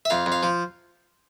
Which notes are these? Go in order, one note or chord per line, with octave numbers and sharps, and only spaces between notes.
E5
F2 F5
F2
F5
F3